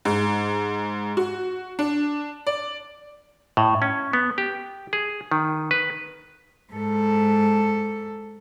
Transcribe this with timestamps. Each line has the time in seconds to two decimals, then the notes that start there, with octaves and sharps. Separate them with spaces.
0.05 G#2
1.17 F#4
1.79 D4
2.47 D5
3.57 A2
3.82 C#4
4.13 B3
4.38 G4
4.93 G#4
5.31 D#3
5.71 B4
6.73 G#2 A4